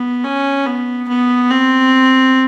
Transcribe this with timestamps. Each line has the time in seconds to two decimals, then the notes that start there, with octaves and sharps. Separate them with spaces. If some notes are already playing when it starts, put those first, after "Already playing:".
Already playing: B3
0.24 C#4
0.66 B3
1.08 B3
1.51 C4